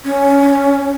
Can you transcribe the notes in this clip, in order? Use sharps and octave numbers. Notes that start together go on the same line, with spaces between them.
C#4